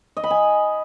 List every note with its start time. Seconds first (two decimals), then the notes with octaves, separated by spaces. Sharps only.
0.17 D#5
0.24 B5
0.31 G#5